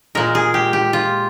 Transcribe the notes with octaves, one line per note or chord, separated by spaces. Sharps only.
A#2 G#3 A#4
G#4
G4
G4
F4